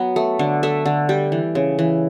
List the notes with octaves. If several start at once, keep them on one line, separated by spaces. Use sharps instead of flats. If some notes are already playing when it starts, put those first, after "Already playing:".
Already playing: F#3 B3
A3
D3
A3 E5
D3
G3 G5
E3
C#3
E3